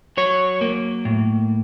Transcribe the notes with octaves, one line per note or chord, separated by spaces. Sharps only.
F#3 C#5
A#3
A2